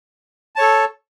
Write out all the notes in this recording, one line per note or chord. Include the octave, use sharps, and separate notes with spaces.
A4 C#5 A5